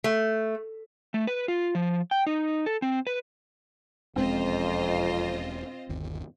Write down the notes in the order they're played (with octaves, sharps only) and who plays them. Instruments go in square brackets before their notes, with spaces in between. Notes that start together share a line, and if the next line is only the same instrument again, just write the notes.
[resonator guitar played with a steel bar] A3
[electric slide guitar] A3
B4
F4
F3
G5
D#4
A4
C4
B4
[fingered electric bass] E1 G#3 C#4 [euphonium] F2 [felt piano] C4 [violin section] F4 C5 D#5
[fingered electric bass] G1 D#2